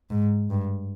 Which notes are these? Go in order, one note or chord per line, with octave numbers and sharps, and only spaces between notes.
G#2
G2